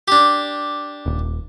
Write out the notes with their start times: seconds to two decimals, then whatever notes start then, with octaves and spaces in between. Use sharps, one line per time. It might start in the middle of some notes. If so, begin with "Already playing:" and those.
0.08 D4 G4
1.06 D#1